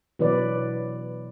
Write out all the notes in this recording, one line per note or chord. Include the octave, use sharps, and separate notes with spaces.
B2 E3 F#3 B4 D5